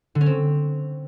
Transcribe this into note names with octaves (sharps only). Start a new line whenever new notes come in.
D3
C#4
C4